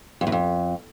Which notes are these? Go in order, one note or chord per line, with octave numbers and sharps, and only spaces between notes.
F2
E2
F2